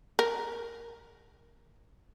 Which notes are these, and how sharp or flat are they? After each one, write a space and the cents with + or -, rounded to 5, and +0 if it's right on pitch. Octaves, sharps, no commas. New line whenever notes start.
A#4 +0